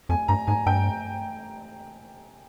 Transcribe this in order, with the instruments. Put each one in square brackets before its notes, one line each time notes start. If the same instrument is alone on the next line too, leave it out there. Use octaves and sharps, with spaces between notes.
[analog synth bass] F2 [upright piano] G#5
[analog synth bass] G2 [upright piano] A#5
[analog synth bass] G#2 [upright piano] G#5
[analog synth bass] G2 [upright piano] G5